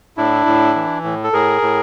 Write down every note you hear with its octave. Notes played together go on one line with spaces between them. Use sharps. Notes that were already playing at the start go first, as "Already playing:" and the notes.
A2 D4 E4
A2
E3
A2
A4
A2 G#4 A#4
A2